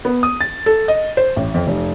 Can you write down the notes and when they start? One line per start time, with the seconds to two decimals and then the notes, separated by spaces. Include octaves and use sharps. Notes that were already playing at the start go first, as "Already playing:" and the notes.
0.05 B3
0.23 D#6
0.41 A6
0.66 A4
0.88 D#5
1.17 C5
1.36 A1
1.54 F2
1.67 F1